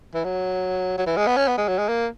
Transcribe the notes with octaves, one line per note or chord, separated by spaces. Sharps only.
E3
F#3
F#3
E3
G#3
B3
C#4
B3
G#3
F#3
G#3
A#3